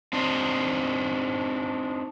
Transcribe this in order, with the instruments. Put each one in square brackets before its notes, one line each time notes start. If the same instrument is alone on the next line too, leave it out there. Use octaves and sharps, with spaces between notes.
[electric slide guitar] C4 D4 D#4